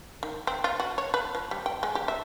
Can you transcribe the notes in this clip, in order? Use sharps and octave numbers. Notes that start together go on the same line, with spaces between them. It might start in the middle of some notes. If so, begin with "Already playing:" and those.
D#3
C4
F4
F#4
C#5
B4
F3
G3
G5
G#3
G4
E5